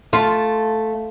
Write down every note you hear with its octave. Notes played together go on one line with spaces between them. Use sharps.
A3 F4